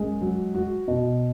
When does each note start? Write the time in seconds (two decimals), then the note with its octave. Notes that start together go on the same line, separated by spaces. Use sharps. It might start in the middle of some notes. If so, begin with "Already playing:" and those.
Already playing: F#2 G#3
0.21 F#3
0.55 F#4
0.88 B2